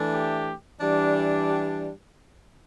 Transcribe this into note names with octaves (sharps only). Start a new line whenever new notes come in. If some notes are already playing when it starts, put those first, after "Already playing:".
Already playing: E3 A3 D4
G4
E3 G3 D4
G4